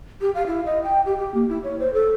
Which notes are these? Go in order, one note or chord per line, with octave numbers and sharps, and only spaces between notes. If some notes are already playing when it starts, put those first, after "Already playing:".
G4
F5
E4
D#5
G5
G4
G4
A#3
E4
C#5
C5
A4